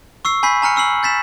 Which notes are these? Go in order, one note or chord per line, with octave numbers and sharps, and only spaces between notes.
C#6 E6 C7
G#5 B5 G6 B6 C7
G#5 A#5 F6 C#7
C#6 E6 C7 F#7
G6 A6 B6 E7